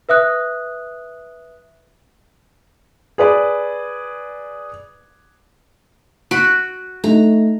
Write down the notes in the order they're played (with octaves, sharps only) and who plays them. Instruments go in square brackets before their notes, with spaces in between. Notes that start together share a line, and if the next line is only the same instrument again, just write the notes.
[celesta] B4 E5 D#6 F#6
[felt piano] G#4 B4 D5
[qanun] F#4 B5 [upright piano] D7
[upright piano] A3 D#4 [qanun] A#5